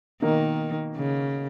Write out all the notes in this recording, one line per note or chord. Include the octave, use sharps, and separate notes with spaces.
B2 D#3 A#3 D#4 A#4
C#3